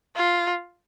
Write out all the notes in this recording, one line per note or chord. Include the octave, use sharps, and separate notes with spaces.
F4